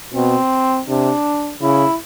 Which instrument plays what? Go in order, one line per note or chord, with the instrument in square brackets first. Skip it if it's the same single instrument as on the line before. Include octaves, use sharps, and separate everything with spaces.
[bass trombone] B2 [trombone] C4
[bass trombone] C3 [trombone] D4
[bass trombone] C#3 [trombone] E4